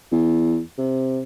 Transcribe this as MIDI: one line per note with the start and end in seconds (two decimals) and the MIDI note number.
0.12 0.60 40
0.78 1.22 48